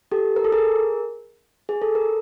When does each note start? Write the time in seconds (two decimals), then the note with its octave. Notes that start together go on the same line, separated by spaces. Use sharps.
0.11 G4 A4
0.36 A#4
0.44 A4
0.52 G#4 A#4
1.69 G#4
1.82 A4
1.95 A#4